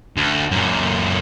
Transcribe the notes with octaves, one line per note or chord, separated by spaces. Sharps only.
D2
F#2 A#2